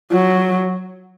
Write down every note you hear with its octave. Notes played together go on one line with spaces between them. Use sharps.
F#3